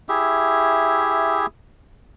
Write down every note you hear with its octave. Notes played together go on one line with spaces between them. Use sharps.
E4 G4 G#4 E5